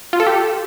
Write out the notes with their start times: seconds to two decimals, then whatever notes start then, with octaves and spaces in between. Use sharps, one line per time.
0.13 F4
0.20 A4
0.27 G4